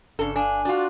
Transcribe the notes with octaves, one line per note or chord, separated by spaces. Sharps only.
G1 C#3 D4 A4
D4 F5 G#5
D4 F4 F#4